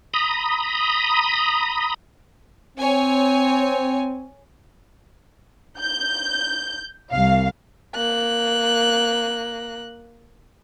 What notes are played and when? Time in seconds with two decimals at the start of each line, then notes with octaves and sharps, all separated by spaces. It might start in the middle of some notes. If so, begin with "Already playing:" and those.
0.14 A#5 B5 D#6
2.78 C4 C#5 G#5
5.79 G6
7.12 C2 F5
7.95 A#3 F#6